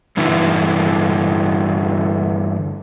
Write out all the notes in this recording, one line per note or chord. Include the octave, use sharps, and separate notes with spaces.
G2 D3 E3 A3